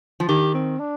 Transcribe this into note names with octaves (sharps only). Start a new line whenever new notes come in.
F3
D#3 G4
C4
D4